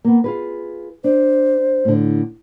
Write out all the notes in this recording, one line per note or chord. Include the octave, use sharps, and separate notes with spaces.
A#3 B3
F4 G#4 B4
D4 C5
A2 D3